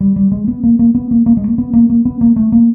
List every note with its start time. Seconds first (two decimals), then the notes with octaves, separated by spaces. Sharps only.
0.01 G3
0.16 G3
0.32 G#3
0.48 B3
0.63 A#3
0.79 A#3
0.95 B3
1.11 A#3
1.26 A#3
1.37 G#3
1.48 A#3
1.58 B3
1.73 A#3
1.90 A#3
2.05 B3
2.21 A#3
2.36 A3
2.52 A#3